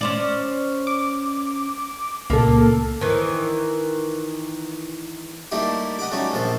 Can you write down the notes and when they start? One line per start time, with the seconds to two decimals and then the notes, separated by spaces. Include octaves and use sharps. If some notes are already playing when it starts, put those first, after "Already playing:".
0.01 C#4 C5 D5
0.87 D6
2.30 C#2 A#2 A#3 A4
3.01 D#3 E3
5.52 G3 A3 A#3 D#4 E4 G4
5.99 D#5 F#5 B5 D6
6.11 G3 A3 C#4 D#4 F#4
6.33 A#1 F3 A4